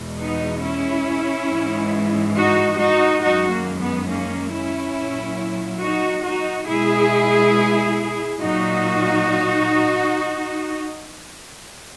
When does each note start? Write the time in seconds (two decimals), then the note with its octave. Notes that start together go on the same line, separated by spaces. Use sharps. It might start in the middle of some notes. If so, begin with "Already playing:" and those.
Already playing: E2 B2 G#3
0.19 B3 D#4
0.62 C#4 E4
1.49 G#2 E3 G#3
2.36 D#4 F#4
2.78 D#4 F#4
3.21 F#2 D#3 G#3 D#4 F#4
3.50 A#3
3.79 B3
4.08 A#3 C#4
4.51 C#4 E4
4.94 A#2 F#3
5.81 D#4 F#4
6.24 D#4 F#4
6.67 B2 G#3 E4 G#4
8.41 A#2 F#3 D#4 F#4